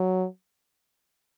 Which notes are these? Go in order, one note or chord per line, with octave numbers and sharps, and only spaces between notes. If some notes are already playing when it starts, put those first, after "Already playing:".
Already playing: F#3